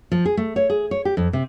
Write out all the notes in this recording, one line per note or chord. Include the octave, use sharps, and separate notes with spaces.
F3
G#4
A3
C#5
G#4
C#5
G4
F2
C3